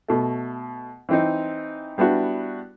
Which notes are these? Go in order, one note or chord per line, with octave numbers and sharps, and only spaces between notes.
B2 A3
E3 C4 D#4
G3 B3 D4 E4 F#4